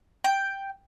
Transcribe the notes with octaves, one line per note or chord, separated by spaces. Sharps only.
G5